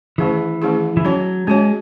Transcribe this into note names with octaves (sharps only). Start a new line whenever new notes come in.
D#3 E3 A3 C#4 E4 G#4
D#3 A3 C#4 E4 G#4
E3
F#3 C#4 F#4 C#5
G#3 C#4 F#4 C#5